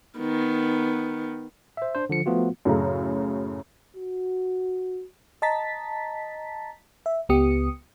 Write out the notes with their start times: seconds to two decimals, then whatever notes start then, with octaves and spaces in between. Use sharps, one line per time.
0.18 D#3 B3
1.77 C5 E5
1.95 D4 C5
2.09 D3 F3 C#7
2.26 F3 A3 B3 F4 F#4
2.65 F#2 A2 C#3 A4 A#5
3.96 F#4
5.42 D#5 A5 A#5 A6 B6
7.06 E5
7.29 C#2 B3 G4 D#6 C#7